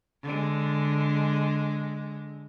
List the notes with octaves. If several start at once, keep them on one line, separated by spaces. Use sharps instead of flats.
D3 G#3